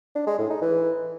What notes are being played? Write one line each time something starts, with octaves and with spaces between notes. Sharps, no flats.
D4
G#3
A2
D#4
E3